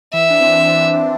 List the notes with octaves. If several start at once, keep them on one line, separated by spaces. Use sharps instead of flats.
E3 E5
D4
C4
D4
D4